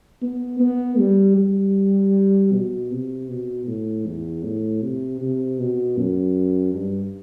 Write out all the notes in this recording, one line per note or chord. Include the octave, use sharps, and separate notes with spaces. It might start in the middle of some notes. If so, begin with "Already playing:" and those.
B3
B3
G3
G3
B2
C3
B2
A2
E2
A2
C3
C3
B2
F#2
G2